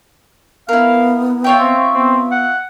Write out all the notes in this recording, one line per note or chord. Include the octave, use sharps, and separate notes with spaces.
B3 E4 A#4 F5
F4 C#5 E5 G5
C4
B3 C4
F#5